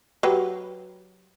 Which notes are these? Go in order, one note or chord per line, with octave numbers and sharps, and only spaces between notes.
F#3 G4 B4